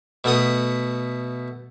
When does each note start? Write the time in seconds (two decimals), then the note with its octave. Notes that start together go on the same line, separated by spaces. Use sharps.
0.24 B2 A3 F#5 D#6